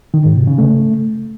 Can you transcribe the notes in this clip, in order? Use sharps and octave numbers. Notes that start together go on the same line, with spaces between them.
D#3
G#2
C3
C#3
A3